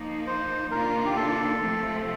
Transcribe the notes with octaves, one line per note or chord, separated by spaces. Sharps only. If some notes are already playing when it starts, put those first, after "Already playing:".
Already playing: F3 A#3 D#4
C5
C3 D#3 A#3 D4 F4 A#4
G4
A4
C3 F3 A3 C4